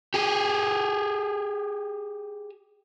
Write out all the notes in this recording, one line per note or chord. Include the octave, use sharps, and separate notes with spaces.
G4 G#4